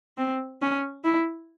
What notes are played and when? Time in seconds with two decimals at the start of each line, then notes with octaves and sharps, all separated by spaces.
0.18 C4
0.62 C#4
1.04 E4